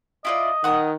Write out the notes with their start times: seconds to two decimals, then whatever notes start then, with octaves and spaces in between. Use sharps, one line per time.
0.25 E4 F4 D5 D#5
0.64 D#3 F#5 D#6